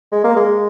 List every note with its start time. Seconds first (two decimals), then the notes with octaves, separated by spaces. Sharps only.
0.12 G#3
0.24 A#3
0.37 G#3